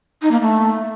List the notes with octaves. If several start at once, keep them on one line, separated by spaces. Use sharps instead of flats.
D#4
A#3
A3